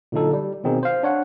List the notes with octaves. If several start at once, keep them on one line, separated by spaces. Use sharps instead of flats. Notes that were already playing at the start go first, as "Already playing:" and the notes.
A#2 D3 F#3 D#4 A4
G3
B2 D#3 C4 D#4 G#4
C5 F5
D4 C#5 F#5